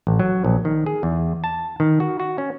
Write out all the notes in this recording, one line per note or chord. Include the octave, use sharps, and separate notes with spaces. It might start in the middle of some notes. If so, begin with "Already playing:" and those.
A1
F#3
A#1
D#3
G#4
E2
A5
D#3
F#4
F#4
C#4